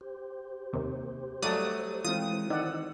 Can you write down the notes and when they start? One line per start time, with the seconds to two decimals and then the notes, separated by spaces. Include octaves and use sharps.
0.01 G4 C5
0.73 D#2 C3
1.42 F#3 G3 A3 D5 A5 D#6
2.04 E3 G#3 C4 E4 F4 D#6
2.50 D#3 E4 C5 D5 F#5 E6